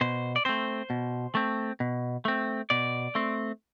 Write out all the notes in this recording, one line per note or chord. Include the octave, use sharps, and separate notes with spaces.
B2 C5
D5
A3 C4 C5
B2
A3 C4
B2
A3 C4
B2 D5
A3 C4